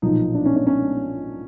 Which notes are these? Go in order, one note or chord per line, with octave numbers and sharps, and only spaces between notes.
B1 A#2 F3 D#4
D4
C#4
C#4
C#4